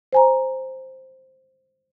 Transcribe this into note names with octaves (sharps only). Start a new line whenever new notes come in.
C5 G#5 A#5